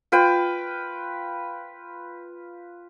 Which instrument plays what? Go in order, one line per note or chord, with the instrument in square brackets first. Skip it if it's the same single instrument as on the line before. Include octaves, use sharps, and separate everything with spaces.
[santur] F4 B4 G5